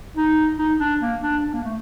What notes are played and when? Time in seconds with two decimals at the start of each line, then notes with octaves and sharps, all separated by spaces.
0.16 D#4
0.59 D#4
0.80 D4
1.01 A#3
1.22 D4
1.43 D4
1.53 A#3
1.64 A3